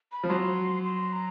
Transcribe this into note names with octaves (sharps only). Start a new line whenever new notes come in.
B5
F3
F#3 C6
C6
A#5